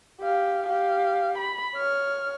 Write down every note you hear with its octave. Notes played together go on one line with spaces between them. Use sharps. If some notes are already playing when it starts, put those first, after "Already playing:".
G4 F5
G4 F5
B5
C#5 F6